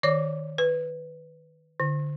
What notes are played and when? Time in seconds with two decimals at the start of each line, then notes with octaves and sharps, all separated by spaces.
0.03 D#3 C#5 D5 D6
0.58 B4
1.80 D3